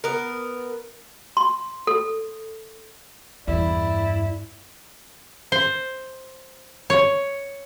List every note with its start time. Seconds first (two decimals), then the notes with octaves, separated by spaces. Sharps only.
0.04 B3 A#4
1.37 C6
1.87 A4
3.48 E2 G2 E4 D5
5.52 C5
6.90 C#5